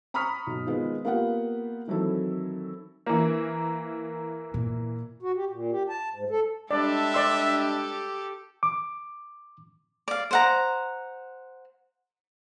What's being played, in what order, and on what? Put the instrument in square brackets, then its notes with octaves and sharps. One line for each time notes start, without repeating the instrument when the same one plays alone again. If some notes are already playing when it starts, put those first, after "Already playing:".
[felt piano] A#5 B5 C#6 D#6 F6 B6
B1
D#3 F3 G#3 B3
A#3 B3 F4 G4 F#5
D#3 E3 F#3 C4 E4 A4
[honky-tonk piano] E3 A#3
[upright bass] A#2
[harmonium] F#4
G4
A#2
G4
A5
G#2
A4
[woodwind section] G3 G#3 D4 [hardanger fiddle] G4 A4 [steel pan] D5 [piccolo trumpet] E5
[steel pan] D5 C6 E6
[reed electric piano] D6
[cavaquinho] D5 F5
C5 F#5 A#5